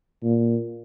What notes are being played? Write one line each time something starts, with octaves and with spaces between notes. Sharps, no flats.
A#2